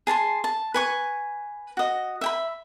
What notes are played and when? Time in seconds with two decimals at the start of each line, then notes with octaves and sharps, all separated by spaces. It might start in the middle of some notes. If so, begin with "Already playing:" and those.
0.07 G#4 A5 A#5 C6
0.44 A5
0.74 B4 G#5 C#6
1.77 F#4 D#5
2.21 E5 G5 B5